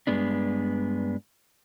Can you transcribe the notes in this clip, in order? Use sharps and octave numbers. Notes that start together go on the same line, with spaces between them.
G2 G#3 B3 D4